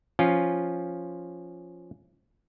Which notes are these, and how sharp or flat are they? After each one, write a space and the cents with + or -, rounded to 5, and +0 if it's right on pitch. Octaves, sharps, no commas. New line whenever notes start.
F3 +0 C#4 +0 F4 +0